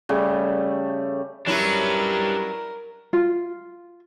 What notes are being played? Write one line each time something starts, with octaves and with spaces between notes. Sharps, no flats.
C#3 G3 A3
F#3 G3 C#4 D4 E4 A#4 B4
F4